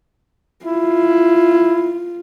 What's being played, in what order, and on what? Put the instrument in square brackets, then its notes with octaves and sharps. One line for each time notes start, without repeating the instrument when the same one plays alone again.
[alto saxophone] E4 [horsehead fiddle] F4